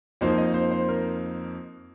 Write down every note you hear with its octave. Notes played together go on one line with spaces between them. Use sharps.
F2 F3 A#3 D#4 C5
D#5
C5
C5
A#4